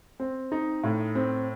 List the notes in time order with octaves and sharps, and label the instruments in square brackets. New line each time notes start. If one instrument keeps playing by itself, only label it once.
[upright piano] C4
D#4
A2
C4